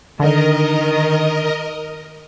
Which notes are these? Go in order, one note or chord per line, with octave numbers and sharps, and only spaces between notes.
D3 D#3 A#4 D#5